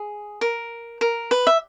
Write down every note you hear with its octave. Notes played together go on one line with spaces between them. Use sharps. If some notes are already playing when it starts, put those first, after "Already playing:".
Already playing: G#4
A#4
A#4
B4
E5